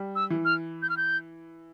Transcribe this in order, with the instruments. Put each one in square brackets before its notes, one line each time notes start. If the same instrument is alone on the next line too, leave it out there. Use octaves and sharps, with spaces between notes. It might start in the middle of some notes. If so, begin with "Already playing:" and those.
Already playing: [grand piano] G3
[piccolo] E6
[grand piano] E3
[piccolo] F6
G6
F6
G6